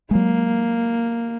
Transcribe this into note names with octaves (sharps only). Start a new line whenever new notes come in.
F#3 G#3 A#3